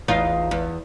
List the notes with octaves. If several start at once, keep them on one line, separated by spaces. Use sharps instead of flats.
A1 E2 D#4 F4
E2